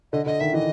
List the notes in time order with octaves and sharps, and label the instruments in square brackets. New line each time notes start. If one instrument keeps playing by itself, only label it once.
[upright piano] D3 [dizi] D#5
[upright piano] D3 [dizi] D#5
[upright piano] D#3 [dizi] E5
[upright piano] E3 [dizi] D#5